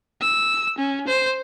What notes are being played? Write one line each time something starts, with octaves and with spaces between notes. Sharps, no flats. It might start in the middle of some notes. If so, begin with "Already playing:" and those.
E6
C#4
C5